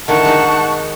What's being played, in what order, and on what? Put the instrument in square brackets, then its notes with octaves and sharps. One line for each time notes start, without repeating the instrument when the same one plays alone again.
[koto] A2 D3 D#3 [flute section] F#5 A5 C#6
[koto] G#3 D#4